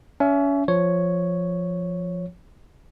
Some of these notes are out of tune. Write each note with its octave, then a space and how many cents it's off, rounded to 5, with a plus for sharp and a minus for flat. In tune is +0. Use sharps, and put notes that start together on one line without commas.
C#4 +30 E5 +20
F3 +0 C#5 +0